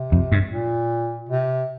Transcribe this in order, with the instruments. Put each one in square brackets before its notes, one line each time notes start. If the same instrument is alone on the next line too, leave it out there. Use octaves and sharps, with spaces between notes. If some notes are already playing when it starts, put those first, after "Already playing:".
Already playing: [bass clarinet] C3
[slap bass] F2
G2
[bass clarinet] A#2
C3